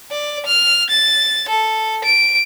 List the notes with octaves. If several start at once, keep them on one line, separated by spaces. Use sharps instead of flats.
D5
F6
A6
A4
D7